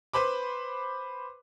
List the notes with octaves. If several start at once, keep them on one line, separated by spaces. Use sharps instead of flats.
B4 C5 B5 D6